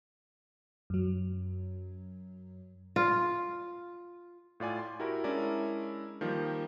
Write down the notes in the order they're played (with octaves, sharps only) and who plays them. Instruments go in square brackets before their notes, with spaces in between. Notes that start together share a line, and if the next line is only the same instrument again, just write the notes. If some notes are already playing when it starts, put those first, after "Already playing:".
[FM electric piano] F#2 F#3
[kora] F4
[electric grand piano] A2 F4 D5 G#5
C6
E4 F#4 G4 A#4
G#3 C#4 D4 E4 A#4 D5
D#3 F3 G3 A#3